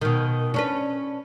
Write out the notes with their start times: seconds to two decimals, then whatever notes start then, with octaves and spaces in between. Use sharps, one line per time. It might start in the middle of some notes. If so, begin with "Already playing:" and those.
0.02 B2 D#3
0.54 C#4 D4 B4